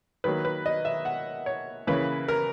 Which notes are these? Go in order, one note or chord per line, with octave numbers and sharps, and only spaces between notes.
D#3 F#3 A#3 B4
B4
D#5
E5
F#5
C#5
C#3 E3 A#3 C#4 B4
A#4